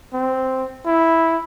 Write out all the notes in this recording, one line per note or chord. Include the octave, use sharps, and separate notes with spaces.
C4
E4